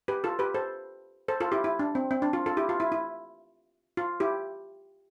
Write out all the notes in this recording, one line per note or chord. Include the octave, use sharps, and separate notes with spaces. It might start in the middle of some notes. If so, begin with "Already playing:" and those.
G4 B4
F4 A4
G4 B4
A4 C5
A4 C5
F4 A4
E4 G4
E4
D4
C4
C4
D4
F4
F4 A4
E4 G4
F4
E4
E4
F4
E4 G4